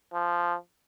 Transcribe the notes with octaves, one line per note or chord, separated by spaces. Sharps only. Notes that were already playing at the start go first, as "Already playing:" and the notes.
F3